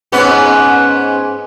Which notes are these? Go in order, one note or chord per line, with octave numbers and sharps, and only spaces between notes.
G#2 B3 C#4